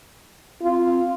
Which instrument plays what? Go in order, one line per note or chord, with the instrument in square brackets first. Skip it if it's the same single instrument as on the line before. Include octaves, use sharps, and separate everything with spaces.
[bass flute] C4 [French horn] F4